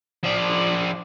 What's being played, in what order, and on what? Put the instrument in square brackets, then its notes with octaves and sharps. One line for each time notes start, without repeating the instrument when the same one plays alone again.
[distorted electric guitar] F3 D5